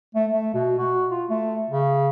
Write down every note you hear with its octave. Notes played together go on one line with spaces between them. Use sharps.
A3
A3
B2
F#4
F4
A3
C#3